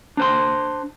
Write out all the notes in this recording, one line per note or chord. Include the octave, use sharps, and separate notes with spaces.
D4 C5 C6